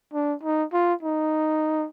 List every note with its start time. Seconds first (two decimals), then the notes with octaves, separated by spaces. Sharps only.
0.13 D4
0.43 D#4
0.73 F4
1.03 D#4